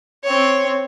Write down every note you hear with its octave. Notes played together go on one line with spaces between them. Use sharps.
C4 C#5